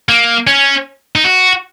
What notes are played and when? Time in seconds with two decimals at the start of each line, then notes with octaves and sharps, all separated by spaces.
0.09 A#3
0.47 C#4
1.16 D#4
1.24 F#4